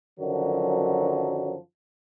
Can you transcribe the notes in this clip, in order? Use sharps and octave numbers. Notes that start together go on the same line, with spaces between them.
F#2 D3 D#3 F3 F#3